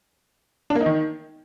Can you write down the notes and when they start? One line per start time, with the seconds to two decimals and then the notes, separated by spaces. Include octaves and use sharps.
0.70 D4
0.75 A#3
0.81 D#4
0.86 D#3